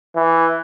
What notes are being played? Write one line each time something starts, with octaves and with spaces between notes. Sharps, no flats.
E3